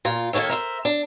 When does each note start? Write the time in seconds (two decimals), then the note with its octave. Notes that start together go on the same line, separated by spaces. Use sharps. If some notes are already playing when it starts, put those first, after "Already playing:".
0.05 A#2 F4
0.33 D#3 A#3 A4 C#5 E5
0.49 A#4 C5 E5
0.85 D4